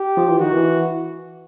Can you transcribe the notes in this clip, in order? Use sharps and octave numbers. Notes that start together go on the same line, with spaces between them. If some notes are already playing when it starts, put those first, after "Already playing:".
Already playing: G4
F3
E3
D#3 F#4
E3